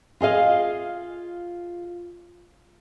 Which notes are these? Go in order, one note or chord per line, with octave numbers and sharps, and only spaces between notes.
F4 G#4 D#5 F5